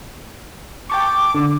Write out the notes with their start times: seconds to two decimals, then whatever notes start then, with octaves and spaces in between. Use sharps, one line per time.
0.90 G5 A5 C#6 D6
1.35 D3